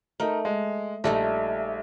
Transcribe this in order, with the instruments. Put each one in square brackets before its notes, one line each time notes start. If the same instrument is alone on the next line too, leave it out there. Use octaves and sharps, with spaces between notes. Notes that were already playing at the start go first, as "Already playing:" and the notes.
[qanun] A3 [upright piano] D#4 A#4
[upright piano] G#3
[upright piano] A#1 [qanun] G3 A3 D#4